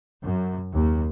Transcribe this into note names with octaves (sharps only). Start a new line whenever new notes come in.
F#2
D#2